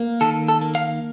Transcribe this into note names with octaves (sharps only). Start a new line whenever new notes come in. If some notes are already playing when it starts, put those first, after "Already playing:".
Already playing: A#3
D#3 A4
A4
A#3
F5